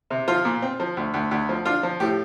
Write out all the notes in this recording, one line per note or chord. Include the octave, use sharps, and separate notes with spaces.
C3
F3 F4
A#2
C4
F3
D2
D2
D2
F3
D4 F4
F3
A2 G4